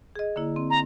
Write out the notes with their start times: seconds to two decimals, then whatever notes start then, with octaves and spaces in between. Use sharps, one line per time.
0.16 G#4 D#5
0.36 D3 A#3 E4
0.56 C4
0.70 A#5